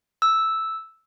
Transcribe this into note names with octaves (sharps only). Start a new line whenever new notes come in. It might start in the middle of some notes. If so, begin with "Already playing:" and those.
E6